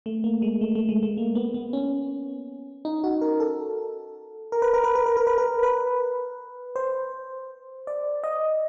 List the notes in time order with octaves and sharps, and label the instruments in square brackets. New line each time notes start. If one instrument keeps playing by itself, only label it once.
[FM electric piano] A3
A#3
G#3
A3
A3
G#3
A3
A#3
B3
B3
C#4
D#4
F#4
A#4
A4
A#4
B4
A#4
B4
A#4
B4
A#4
B4
A#4
B4
C5
D5
D#5